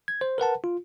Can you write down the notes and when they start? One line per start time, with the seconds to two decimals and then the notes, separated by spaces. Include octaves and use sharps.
0.08 G#6
0.21 C5
0.38 A#4 B4 F#5 A5
0.64 F4